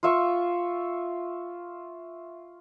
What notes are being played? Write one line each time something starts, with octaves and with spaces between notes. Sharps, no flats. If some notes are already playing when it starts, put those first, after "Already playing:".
F4 E5 C#6